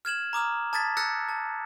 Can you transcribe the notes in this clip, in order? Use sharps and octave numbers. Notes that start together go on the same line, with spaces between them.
F6 G#6 E7 F#7
A#5 D6 D#6 F6
A5 D#6 G#6 A6 B6
E6 F#6 A6 A#6 C#7
A5